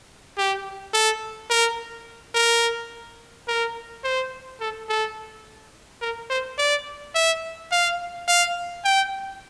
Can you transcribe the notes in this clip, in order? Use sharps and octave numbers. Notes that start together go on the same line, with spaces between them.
G4
A4
A#4
A#4
A#4
C5
A4
A4
A#4
C5
D5
E5
F5
F5
G5